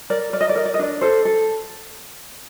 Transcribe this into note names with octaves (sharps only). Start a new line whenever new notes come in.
A#4 D5
A#4 D5
D#5
D5
A#4 D#5
D5
D#5
D4 D5
A4 C5
A4